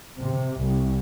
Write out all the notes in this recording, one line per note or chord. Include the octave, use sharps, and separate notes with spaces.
C3
C2